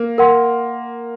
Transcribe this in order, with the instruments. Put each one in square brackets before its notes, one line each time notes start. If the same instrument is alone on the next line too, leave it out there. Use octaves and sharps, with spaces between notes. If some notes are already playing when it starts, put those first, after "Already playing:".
Already playing: [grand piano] A#3
[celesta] A#4 F#5 C6